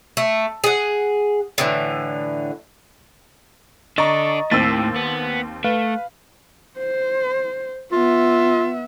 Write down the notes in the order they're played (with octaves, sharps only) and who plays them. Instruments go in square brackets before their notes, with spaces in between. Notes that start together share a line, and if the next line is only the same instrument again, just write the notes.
[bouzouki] A3
G#4 F#5
A2 D3 E3
[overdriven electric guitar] D3 D5 [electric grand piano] D#5 [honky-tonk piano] A#5 C#6 A6
[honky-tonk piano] D#2 C4 E6 [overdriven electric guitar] A2 [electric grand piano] A6
[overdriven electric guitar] B3
[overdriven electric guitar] A3 [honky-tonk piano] B4 [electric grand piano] F5
[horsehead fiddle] C5
[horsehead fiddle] B3 E5 [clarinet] F4